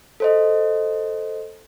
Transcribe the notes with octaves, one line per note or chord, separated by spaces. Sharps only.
A4 C5 D#5